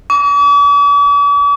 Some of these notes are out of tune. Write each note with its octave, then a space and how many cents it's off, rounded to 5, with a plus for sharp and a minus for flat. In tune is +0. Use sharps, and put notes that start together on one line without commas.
D6 -45